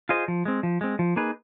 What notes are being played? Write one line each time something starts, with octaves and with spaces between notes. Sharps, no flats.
F4 G#4 C5 D#5
F3
G#3 C4
F3
G#3 C4
F3
A#3 D#4 G#4 B4